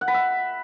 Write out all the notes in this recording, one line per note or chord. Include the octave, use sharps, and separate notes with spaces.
F#5
B5
E5